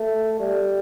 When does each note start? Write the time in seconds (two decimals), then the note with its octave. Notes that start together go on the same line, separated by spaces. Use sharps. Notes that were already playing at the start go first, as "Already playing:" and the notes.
Already playing: A3
0.39 G3